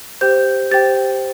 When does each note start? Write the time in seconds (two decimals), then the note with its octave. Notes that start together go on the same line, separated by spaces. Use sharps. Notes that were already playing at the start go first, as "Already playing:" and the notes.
0.21 G4 C5 G5 G6
0.71 G4 C5 G5 A6